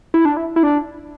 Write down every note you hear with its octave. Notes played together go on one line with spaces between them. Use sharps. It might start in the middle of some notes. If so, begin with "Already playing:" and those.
E4
D4
E4
E4
D4